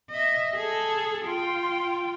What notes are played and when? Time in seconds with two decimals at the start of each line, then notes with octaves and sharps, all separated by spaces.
0.11 D#5 E5
0.55 G#4 A4
1.25 F4 G5